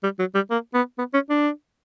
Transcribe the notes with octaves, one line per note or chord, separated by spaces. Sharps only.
G3
F#3
G3
A#3
B3
B3
C#4
D4